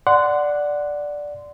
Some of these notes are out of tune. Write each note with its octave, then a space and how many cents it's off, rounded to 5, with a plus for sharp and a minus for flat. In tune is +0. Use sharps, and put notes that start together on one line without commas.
D5 +0 F#5 +0 C6 -20